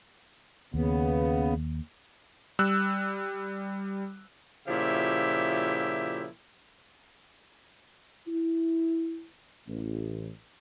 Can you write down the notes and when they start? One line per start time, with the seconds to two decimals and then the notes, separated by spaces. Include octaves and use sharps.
0.74 D#2 C#3 B3
2.59 G3 E6 F#6
4.68 A#2 C#3 F3 E4 G4 E5
8.27 E4
9.67 A1